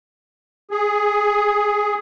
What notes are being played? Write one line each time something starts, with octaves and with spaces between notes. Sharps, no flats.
G#4